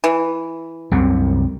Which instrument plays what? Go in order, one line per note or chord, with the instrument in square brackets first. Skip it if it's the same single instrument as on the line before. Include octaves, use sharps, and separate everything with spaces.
[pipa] E3
[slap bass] C2 F#2 C3